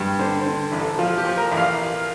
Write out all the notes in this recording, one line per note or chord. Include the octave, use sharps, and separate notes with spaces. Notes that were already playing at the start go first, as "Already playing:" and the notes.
Already playing: G2
D3 C5
C5
D3
A1
A4
F3 F4
G4
F3
A#4
A1
F5